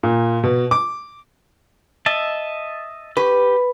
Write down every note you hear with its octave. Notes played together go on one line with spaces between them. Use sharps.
A#2
B2
D6
D#5 E5 A5
G4 B4